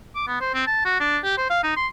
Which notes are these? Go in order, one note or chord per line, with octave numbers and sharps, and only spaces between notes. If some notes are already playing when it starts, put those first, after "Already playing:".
D6
B3
C5
C4
A5
F#4
D4
G4
C5
F5
D#4
C6